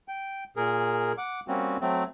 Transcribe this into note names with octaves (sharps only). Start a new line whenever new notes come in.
G5
A#2 G#4 A#4
F#5 D6
G3 A#3 C4 C#4 F#4
F#3 A3 C4